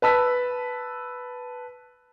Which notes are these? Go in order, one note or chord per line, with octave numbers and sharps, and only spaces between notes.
B4 A5 E6 B6